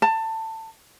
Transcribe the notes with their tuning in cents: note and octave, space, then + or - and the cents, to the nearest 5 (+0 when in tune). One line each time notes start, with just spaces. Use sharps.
A5 +20